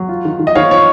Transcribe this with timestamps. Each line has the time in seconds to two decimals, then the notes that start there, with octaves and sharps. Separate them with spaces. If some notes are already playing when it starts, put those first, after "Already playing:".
Already playing: F#3
0.09 F4
0.25 D#3
0.39 D#3
0.47 D#5
0.55 D#3 C#5 F5
0.71 F4 C#5